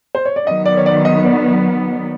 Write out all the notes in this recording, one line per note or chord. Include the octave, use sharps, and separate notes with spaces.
C5
C#5
D5
D#3 F#3 B3 D#5
D5
C#5
D5
D#5
D5